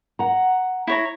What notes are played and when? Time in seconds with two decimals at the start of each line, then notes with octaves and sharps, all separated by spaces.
0.19 F#5 A#5
0.87 E4 C#5 A#5